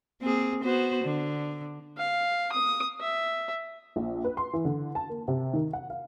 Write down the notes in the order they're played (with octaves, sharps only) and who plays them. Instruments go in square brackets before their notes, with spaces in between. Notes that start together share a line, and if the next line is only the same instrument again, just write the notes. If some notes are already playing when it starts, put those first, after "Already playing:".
[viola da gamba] A#3 C4 G#4
B3 F#4 C5
D3
[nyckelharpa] F5
D#6
E5
[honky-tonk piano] A#1
B4
C6
E3
D3
A5
A#3
C3
D#3
F#5
F5